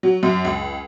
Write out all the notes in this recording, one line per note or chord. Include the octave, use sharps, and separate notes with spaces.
F#3
F#2
C#2